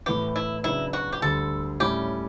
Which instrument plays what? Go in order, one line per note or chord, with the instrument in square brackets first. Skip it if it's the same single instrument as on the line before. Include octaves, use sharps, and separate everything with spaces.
[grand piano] A2 E3 B3 [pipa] G4
[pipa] E4
[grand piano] C#3 F#3 B3 D4 [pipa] E4
[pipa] F#4
G4
[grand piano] D2 D3 G3 [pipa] A4
[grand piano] A2 G3 C#4 E4 [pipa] G4